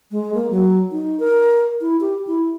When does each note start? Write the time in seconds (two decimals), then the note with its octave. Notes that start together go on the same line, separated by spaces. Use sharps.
0.11 G#3
0.34 A#3
0.51 F#3
0.92 D#4
1.20 A#4
1.81 E4
2.01 G4
2.27 E4